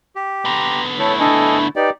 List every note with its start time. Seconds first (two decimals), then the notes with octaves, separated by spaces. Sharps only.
0.16 G4
0.45 D3 B3 A#5 C6
0.99 A3 E4 A4 C#5
1.20 D4 A4 D#5 G#5
1.76 D#4 G4 B4 D5